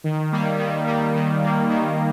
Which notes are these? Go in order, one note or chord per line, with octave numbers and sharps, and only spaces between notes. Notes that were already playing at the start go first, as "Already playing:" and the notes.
D#3
G3 A#3
D#3
G3 A#3
D#3
G3 A#3
D#3